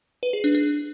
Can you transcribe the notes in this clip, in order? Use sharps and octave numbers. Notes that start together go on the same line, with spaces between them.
B4
G#4
D4
D4